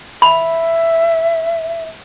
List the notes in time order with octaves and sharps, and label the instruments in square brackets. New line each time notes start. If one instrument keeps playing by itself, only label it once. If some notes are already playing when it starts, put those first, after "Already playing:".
[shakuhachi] E5 [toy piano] B5